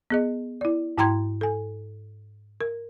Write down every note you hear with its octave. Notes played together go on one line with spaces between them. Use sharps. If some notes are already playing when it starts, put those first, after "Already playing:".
B3 G#4 D#5
E4 D5
G#2 E4 G5 A#5 C6 G#6
A4 G#5
A#4